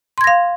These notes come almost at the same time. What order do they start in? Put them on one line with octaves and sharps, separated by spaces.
C6 G#6 A#6 F5